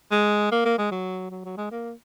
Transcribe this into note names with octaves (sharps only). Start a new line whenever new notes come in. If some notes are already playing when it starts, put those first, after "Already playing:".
G#3
A#3
A#3
G#3
F#3
F#3
F#3
G#3
A#3